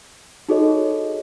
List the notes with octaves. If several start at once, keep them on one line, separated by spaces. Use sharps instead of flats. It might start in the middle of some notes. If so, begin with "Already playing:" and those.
D#4 F#4 G#4 A4 C#5 D#5